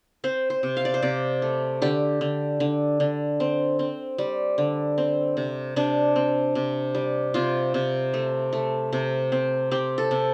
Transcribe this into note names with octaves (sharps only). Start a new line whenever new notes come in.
C4 C5
C5
C3
F5
D5
C5
C3 D5
A3
D3 G4
D3
D3
D3
C4
C4
G3
D3
C4
C3
C3 D4
C4
C3
G3
C3 F4
C3
A3
A3
C3
C4
C4 G4
A4
C3